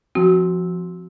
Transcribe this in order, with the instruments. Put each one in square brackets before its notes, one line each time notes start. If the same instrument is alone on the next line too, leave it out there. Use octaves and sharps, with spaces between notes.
[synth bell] F3 C4 [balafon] F#4